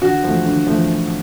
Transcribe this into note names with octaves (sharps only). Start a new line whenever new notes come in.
D3 F#4
F3 A3
D3
F3 A3